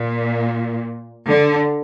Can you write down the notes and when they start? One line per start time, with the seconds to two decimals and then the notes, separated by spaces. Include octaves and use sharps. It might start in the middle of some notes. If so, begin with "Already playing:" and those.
Already playing: A#2
1.28 D3